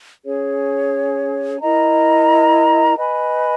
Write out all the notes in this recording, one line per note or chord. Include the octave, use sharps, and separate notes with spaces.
C#4 G#4 C#5
E4 A#4 D#5 A#5
B4 D#5 G#5 B5